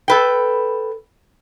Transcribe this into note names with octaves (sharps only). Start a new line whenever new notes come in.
A4 B4 G5